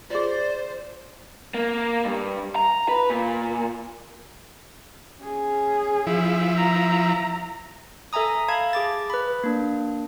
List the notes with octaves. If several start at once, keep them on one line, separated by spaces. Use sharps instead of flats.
F4 G#4 C5 D5
A#3
G2
A#5
B4
A#2
C#4 G#4
F3 E4
A#5
A4 E5 G#5 A#5 D#6
F5 A5 B5 G#6
G#4 D6 A6
B4 B5
A#3 D4